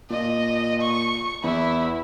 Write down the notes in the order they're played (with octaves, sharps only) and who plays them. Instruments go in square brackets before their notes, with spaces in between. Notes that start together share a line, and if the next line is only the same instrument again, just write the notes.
[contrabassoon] A#2 [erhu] D#5
[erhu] C#6
[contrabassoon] E2 [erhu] E4